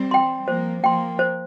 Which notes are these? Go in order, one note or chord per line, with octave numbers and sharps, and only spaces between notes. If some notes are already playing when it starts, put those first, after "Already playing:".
Already playing: G3 C4
G5 C6
F3 A#3 C5
F3 A#3 G5 C6
C5